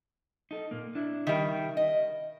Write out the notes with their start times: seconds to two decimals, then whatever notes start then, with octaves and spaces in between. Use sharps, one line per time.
0.51 D#4 A4
0.71 A#2 A#3
0.95 D4 E4
1.27 D#3 G3 A#4 E5
1.77 D#5